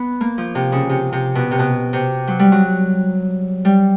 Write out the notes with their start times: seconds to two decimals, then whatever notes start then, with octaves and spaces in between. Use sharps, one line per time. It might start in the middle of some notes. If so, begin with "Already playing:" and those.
Already playing: B3
0.21 A#3
0.38 F3
0.55 C3
0.72 C#3
0.89 C3
1.13 C3
1.35 B2
1.51 C3
1.59 B2
1.93 C3
2.28 F#3
2.39 G3
2.52 F#3
3.65 G3